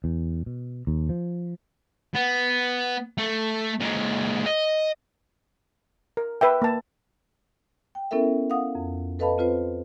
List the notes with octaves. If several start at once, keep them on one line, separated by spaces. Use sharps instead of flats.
E2
B2
D#2
F3
B3
A3
A#2 G#3
D#5
A#4
B4 E5 G5
A#3 A5
G5
B3 C#4 E4 A4 A#4 E5
F5 F#5 D#6
F2
A4 B4 D#5 F5 A5 B5
C4 F4 B4 C5